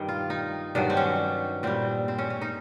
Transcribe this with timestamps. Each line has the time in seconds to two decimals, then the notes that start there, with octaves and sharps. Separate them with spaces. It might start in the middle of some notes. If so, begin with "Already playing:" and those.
Already playing: G2 D#3 G3
0.08 F4
0.30 D#4
0.75 G2 D#3 F#3 D4
0.90 C4
0.97 C#4
1.63 A#2 G3 C4
2.08 C4
2.19 C#4
2.30 C#4
2.41 D#4